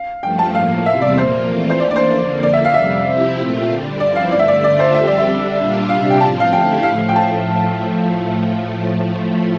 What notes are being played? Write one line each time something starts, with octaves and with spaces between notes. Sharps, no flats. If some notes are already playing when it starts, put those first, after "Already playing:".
Already playing: F5
G2 F3 A3 G5
A5
A2 F3 A#3 F5
E2 C3 G3 C4 E5
D5
A#2 F3 A#3 F4 C5
E3 A3 C4 F4
C5
E3 A#3 D4 D5
D5
C5
F2 D3 F3 A#3
D3 F3 A#3 D5
E5
F5
F2 C3 G3 E5
C3 F3 C4 E4 G4
A#2 A3 C4 F4
D3 G3 D4
G2 F3 C4 E4 D5
F5
G2 D3 A3 D5
E5
D5
D3 A3 D4 F4 D5
C5
F2 D3 G3 C4 G4 E5
D5
E5
D3 G3 D4
A#2 G3 D4 F4
C3 G3 D4 G4 F5
G5
A2 F3 C4 F4 A5
F5
D3 A3 E4 G4 G5
A2 F3 A3 F5
G5
A5